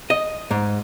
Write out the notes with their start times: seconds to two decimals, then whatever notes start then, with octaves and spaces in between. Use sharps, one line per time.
0.10 D#5
0.51 G#2